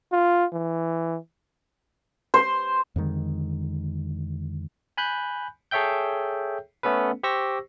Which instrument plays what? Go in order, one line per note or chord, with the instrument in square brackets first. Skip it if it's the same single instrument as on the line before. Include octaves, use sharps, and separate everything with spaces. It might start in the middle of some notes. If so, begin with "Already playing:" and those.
[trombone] F4
E3
[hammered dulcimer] C5
[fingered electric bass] F2 D3 D#3 G#3
[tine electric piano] G#5 B5 F#6 G6
G#4 A4 C#5 E5 G5 G6
A3 B3 C#4 A4 B4
G4 C5 C#6 E6 A#6